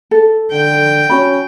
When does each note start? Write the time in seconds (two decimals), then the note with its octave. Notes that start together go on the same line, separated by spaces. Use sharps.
0.11 A4
0.52 D3 G5
1.10 C#4 F#4 B5